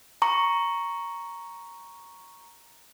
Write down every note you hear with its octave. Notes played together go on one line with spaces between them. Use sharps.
A#5 C#6